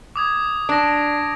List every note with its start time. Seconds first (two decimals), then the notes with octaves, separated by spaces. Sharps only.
0.16 D6 D#6 G#6
0.69 D4 A#6 D7